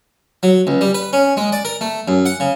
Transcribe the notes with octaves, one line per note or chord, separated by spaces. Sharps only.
F#3
C#2
G3
B4
C#4
G#3
D5
A#4
A3
F#2
F#5
C#3